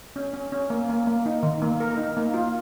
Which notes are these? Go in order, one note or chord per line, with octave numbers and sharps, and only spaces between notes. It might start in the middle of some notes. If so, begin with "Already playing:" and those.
C#4
C#4
C#4
A#3
A#3
A#3
D#4
D#3
A#3
A#4
D#4
A#3
F4